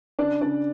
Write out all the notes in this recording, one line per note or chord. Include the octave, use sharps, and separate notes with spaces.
C#3 D4 D5
C#3 D4 D5